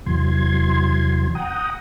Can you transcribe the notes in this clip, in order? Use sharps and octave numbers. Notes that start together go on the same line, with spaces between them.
E2 C3 E3 F#3 C6 G#6
F#5 G5 A#5 D#6